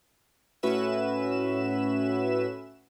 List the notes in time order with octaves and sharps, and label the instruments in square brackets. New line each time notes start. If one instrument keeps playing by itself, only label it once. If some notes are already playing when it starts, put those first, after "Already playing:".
[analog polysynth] A2 C#4 F#4 B4 E5 E7